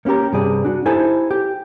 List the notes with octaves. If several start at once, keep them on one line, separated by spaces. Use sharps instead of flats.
A#3 C#4 E4 G4 A#4
G2 C3 G#4 D5
D4 F#4
D#4 E4 G4 A4 C5 G#5
G4